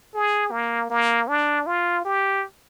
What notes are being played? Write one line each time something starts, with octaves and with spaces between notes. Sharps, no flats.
G#4
A#3
A#3
D4
F4
G4